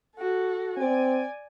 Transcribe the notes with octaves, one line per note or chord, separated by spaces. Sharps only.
F#4 A4
C4 D5 G#5